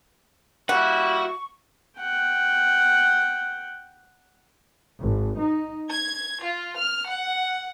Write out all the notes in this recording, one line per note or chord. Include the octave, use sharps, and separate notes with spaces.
G3 A#3 E4 F#4 F#5 C#6
F#5 G5
G#1
D#4
G#6
F4
F6
F#5